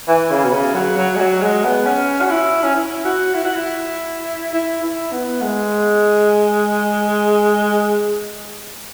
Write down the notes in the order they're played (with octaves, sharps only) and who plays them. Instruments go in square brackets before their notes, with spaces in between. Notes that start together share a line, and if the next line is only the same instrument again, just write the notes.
[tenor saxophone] E3
C#3
B2
C#3
F#3
F#3
G#3
F#3
G#3
B3
C#4
F#4
E4
C#4
E4
F#4
E4
F#4
E4
E4
E4
B3
G#3